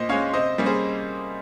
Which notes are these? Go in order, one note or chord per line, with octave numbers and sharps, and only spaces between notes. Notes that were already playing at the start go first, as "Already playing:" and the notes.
Already playing: A#2 C5 D#5
G#3 C#4 C#5 F5
C3 C5 D#5
G3 A#3 C#4
G#4 C5